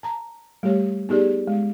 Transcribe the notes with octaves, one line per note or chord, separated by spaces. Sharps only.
A5 A#5
G3 A3 G4 C#5
B3 D#4 G4 G#4 D5
G#3